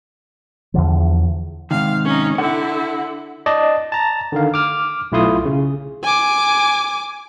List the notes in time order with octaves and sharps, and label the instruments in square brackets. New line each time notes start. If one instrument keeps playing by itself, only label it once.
[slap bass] E2 D3 F3
[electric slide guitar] G#2 C3 D#3 [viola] F5
[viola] C#4 D#4
[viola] D3 E4 [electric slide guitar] F#5
[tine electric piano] D5 D#5 A5
A5 A#5
D3 D#3 F5
D6 F6
B1 A3 E4 F4 C6 D#6
C#3
[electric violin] G#5 D6